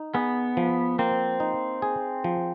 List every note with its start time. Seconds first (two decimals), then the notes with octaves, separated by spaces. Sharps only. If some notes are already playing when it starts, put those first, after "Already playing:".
Already playing: D#4
0.14 B3 G#4
0.57 F3
0.99 A#3 C4
1.40 D#4
1.82 G#4
2.24 F3